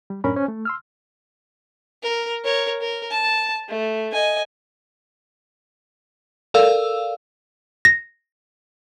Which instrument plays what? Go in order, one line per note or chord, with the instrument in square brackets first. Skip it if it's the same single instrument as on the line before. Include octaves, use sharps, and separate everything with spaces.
[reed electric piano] G3
F#2 A2 C#4 D4 A#4 B5
C#4 C5 G#5
A3
C6 E6 F6
[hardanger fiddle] A#4
A#4 C#5
A#4
A5
A3
D#5 G#5
[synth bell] A4 A#4 D5 F5 E6
[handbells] A#6